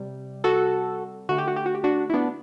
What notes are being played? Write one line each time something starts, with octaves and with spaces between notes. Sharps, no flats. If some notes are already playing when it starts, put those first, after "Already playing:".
Already playing: C3 G3
F#4 A4
D3 A3 F#4
G4
F#4
G4
F#4
G4
D4 F#4
E4
B3 D4